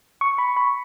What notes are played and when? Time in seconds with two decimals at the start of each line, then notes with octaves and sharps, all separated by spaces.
0.21 C#6
0.38 B5
0.57 B5